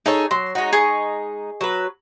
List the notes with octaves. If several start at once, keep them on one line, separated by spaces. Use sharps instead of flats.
D#4 G#4 A4 C#5
F#3 C6
G#3 D#4 F#4 C#5
G#4 D#5 C#6
F#3 B4